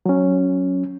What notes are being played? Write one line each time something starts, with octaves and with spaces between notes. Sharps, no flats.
F#3 C#4